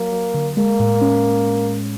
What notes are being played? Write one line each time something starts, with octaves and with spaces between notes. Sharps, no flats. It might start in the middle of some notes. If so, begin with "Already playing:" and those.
Already playing: F#3 A#3
F#3
D3
G#3 A#3
A2
C#4